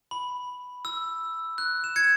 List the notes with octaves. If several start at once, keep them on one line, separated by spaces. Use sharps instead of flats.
B5
E6
F#6
E7
G#6 C#7